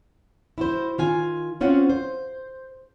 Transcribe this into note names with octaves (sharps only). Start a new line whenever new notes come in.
E4 F#4 C5
D#3 F4 G#5
C4 C#4 F4 C5 F#5
C5